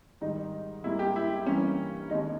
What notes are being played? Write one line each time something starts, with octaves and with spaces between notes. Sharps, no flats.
G#2 D#3 G3 D#4
G#2 G3 A#3 E4
G4
E4
G2 E3 G3 A#3 C#4
D#2 D#3 G#3 D#4